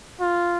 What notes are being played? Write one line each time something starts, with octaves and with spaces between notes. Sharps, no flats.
F4